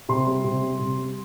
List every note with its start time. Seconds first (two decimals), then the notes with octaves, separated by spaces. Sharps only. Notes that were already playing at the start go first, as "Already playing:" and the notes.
0.09 C3 C6
0.27 G3
0.44 C3
0.62 G3
0.79 C3
0.98 G3